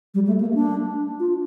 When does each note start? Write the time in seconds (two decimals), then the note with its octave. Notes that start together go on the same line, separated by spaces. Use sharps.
0.14 G3
0.27 A3
0.40 A#3
0.54 D4
1.20 F4